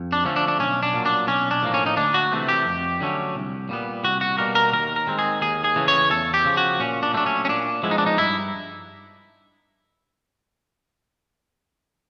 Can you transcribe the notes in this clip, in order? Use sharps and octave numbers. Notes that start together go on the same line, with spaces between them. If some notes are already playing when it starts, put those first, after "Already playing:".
Already playing: F2
D4
D3 F3 A3 C#4
D4
D4
B1 C#4
D4
A#2 F#3
D4
B1 C#4
D4
A2 F3 A#3
C#4
D#4
D2 D4
F#4
C3 E3 A3 C4
G4
F2
D3 F#3 A3 C#4
C2
A#2 G3 B3
C2 F#4
F#4
B2 G3 A#3 A#4
A#4
D#2 A#4
A#4
D#3 G#3 C4
G#4
D#2 G#4
G#4
C#3 E3 A3
C#5
E2 A4
G4
C#3 F3
F#4
A#2 C#4
D4
F#3 A3 C4 D4
C#4
C#4
A#2 D4
F3 G#3 B3 E4
D#4
D4
D#4
G2 E4